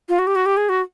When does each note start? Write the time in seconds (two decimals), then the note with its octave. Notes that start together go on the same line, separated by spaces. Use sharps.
0.09 F4
0.19 F#4
0.27 G4
0.36 F#4
0.46 G4
0.57 G#4
0.69 F#4